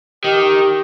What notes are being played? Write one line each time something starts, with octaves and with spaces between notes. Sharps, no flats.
D#3 G4